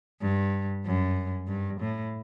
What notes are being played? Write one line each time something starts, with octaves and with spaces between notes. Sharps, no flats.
G2
F#2
G2
A2